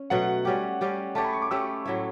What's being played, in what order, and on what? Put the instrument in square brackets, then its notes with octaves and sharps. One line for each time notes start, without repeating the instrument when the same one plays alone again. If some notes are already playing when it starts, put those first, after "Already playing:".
Already playing: [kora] C#4
[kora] B2 F#3 A3 [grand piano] F#5
[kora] G3 C#4 G4
G3 C#4 G4
[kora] A3 C#4 G4 C#5 [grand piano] A5
[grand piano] B5
C#6
D6
[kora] A3 C#4 G4 C#5 [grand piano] E6
[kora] A2 F#3 A3 E4